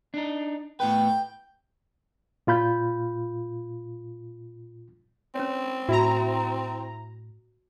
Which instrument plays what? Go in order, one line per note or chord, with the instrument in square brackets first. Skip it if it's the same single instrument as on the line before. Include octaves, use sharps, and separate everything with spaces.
[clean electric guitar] D4 D#4
[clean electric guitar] A2 B3 B4 [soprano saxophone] G5
[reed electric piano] A#2 F4 B5 G6
[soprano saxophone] C4 [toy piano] C#4 B4 C#5
[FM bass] A2 [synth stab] E4 A#5 [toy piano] F#4